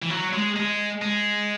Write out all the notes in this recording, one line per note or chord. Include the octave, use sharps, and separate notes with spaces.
E3
F#3
G#3
G#3
G#3